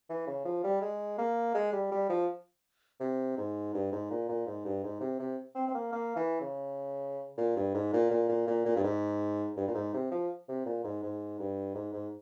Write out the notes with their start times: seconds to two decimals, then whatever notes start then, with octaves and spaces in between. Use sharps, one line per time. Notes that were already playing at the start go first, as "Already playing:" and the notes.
0.10 E3
0.27 C#3
0.45 F3
0.64 G3
0.82 G#3
1.18 A#3
1.55 G#3
1.73 G3
1.92 G3
2.09 F3
3.00 C3
3.38 G#2
3.74 G2
3.92 G#2
4.10 A#2
4.29 A#2
4.46 G#2
4.65 G2
4.84 G#2
5.01 C3
5.19 C3
5.55 C4
5.68 C4
5.75 A#3
5.93 A#3
6.16 E3
6.41 C#3
7.38 A#2
7.56 G2
7.74 G#2
7.94 A#2
8.11 A#2
8.29 A#2
8.47 A#2
8.66 A#2
8.76 G2
8.84 G#2
9.57 G2
9.68 A#2
9.75 G#2
9.94 C3
10.12 F3
10.49 C3
10.66 A#2
10.84 G#2
11.03 G#2
11.40 G2
11.75 G#2
11.94 G#2